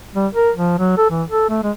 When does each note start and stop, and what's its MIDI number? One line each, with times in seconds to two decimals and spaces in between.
0.15 0.27 55
0.33 0.50 70
0.56 0.76 53
0.78 0.95 54
0.97 1.09 69
1.10 1.23 52
1.29 1.48 69
1.49 1.60 57
1.63 1.71 56